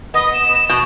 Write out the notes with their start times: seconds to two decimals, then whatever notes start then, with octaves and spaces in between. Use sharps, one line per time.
0.14 B3 D#5
0.34 E7
0.69 B2